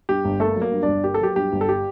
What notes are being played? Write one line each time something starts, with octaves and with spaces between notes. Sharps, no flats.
G2 G4
G1
A3 A#3 A4
F#3
A#3 A#4
G2
D4 D5
G1
A#3 G4
A4
F#3 G4
G2 G4
G1
A4
G4